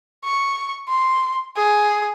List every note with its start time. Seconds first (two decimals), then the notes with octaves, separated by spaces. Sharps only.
0.25 C#6
0.89 C6
1.57 G#4